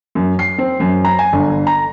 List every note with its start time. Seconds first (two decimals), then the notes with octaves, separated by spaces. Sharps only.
0.15 F#2
0.39 C7
0.58 C4
0.80 F#2
1.05 A#5
1.19 G#5
1.33 G1
1.67 A#5